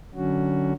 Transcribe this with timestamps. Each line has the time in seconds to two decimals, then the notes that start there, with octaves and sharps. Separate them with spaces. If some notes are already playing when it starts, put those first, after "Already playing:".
0.14 D3 F#3 C#4 F#4